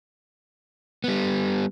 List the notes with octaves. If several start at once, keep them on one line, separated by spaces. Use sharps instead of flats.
G3 B3